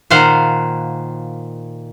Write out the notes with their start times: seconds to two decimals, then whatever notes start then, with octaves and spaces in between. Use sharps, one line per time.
0.10 A#2 D#3 C5 F5 F#5